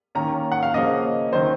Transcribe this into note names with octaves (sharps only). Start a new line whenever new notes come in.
D#3 A#3 C#4 A#5
F#5
F5
C#3 F3 A#3 C#4 D#5
D#3 F#3 C#4 C5